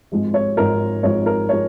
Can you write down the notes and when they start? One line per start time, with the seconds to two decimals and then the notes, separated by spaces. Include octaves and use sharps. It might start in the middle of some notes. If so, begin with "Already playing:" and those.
0.12 G#1 G#2 F3 G#3
0.34 C#5
0.57 G#1 G#2 F3 G#3 A#4
1.03 G#1 G#2 F3 G#3 C#5
1.26 A#4
1.49 F3 G#3 C#5